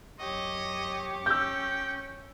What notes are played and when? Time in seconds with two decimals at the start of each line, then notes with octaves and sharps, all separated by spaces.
0.19 F#2 G4 C#5 D#5
1.26 C#4 G5 E6 G6